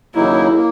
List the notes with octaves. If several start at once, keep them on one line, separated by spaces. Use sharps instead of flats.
D#2 C#3 F#3 A#3 D#4 E4
A#3